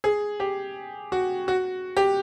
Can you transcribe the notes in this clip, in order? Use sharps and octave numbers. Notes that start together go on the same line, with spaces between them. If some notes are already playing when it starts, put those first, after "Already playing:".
G#4
G4
F#4
F#4
G4